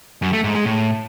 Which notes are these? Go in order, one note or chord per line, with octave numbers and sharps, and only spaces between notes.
F#2
A3
G#2
G#3
A2